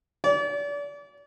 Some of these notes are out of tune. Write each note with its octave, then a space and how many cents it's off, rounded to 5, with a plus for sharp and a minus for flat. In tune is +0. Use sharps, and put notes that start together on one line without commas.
D5 -35